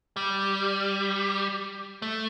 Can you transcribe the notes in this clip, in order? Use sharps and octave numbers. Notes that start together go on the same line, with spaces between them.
G3
A3